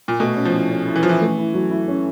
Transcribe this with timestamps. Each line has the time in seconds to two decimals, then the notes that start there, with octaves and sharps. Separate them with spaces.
0.08 A#2
0.20 B2 A3
0.36 C#4
0.45 F3
0.54 E4
0.70 C#4
0.86 E4
0.96 E3
1.03 F3 E4
1.09 E3
1.21 A3
1.38 E4
1.54 F#3
1.71 E4
1.88 C#4